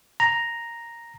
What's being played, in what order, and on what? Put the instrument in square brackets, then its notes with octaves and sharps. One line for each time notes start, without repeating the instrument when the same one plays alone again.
[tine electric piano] A#5